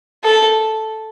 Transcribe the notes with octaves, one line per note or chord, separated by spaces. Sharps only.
A4